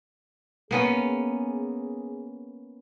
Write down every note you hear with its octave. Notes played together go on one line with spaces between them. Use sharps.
A#3 B3 C#4 G#4